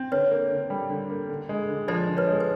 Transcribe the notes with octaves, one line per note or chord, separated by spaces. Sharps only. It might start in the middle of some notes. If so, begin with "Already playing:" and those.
Already playing: C4
D3 B4 C#5
A#3
D3
G3
D3
A#3
D3
G#3
D3
F3 C5 D5
D3
B4 C#5
G#3
B4